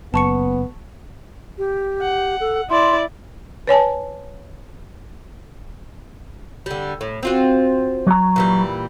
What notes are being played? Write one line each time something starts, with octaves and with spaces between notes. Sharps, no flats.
F#1 B3 A5 C#6 C#7
G4
F#5
A4
E4 D5 C6
B4 C#5 G#5 A5
D3 G3
A2
C4 F4 F#4
F#3 F#4 A#5
A#2 E3 G3